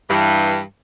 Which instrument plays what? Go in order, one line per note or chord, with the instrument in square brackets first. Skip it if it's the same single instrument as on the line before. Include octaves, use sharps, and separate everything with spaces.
[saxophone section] G2 E3